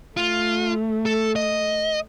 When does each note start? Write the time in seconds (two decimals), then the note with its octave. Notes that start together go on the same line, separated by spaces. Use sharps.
0.17 A3 F4
1.06 A4
1.36 D#5